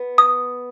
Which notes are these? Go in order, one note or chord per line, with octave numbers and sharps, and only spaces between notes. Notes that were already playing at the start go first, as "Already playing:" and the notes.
Already playing: B3
D#6